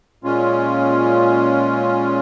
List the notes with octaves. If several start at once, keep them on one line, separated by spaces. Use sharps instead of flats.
A#2 G#3 C#4 F4